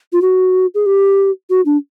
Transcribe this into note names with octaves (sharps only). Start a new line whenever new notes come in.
F4
F#4
G#4
G4
F#4
D4